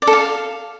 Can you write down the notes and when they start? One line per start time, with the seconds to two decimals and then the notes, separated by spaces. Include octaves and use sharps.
0.02 D5
0.07 A4
0.13 F5